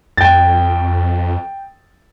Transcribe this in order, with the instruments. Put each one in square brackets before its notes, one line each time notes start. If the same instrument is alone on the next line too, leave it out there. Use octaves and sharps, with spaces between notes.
[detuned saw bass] F2 [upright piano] G5 A6